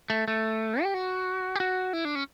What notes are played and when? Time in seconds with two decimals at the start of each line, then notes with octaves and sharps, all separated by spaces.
0.10 A3
0.28 A3
0.83 G4
0.94 F#4
1.56 G4
1.60 F#4
1.93 E4
2.05 D4
2.15 C#4